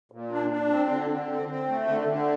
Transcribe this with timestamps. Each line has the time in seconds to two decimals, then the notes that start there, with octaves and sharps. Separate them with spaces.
0.12 A#2
0.32 D4
0.50 D4
0.70 C4
0.90 D3
1.10 D3
1.29 C4
1.49 C4
1.68 A3
1.88 D3
2.09 D3